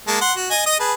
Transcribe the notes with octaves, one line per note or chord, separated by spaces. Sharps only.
G#3 A#3 A5
F#5 C6
F#4
D#5 G#5
D#5 D#6
G#4 B4 A5